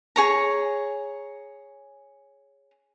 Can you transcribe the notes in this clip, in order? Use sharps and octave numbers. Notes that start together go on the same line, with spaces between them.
G#4 C#5 A#5